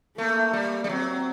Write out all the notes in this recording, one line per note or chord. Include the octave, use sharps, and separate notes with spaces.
A3 A#3
G3
G3
F#3 C4